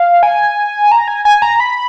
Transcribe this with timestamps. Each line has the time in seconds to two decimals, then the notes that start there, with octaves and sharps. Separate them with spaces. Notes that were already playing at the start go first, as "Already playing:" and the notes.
Already playing: F5
0.23 G#5
0.92 A#5
1.08 G#5
1.25 G#5
1.42 A#5
1.60 B5